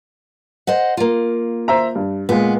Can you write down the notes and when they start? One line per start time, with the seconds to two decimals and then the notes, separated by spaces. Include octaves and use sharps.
0.67 C5 D#5 F#5
0.97 A#3 F4
1.68 C5 E5 A#5
1.95 G2
2.29 A#2 G#3 B3